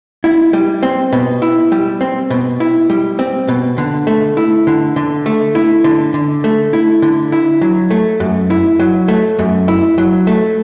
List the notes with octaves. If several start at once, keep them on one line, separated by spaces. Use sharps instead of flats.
E4
G3
C4
B2
E4
G3
C4
B2
E4
G3
C4
B2
D3
A3
E4
D3
D3
A3
E4
D3
D3
A3
E4
D3
E4
F#3
A3
F#2
E4
F#3
A3
F#2
E4
F#3
A3